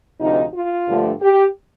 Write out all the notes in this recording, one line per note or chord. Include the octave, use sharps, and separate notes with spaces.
D2 C3 F3 D#4
F4
G2 D3 F3 A3
G4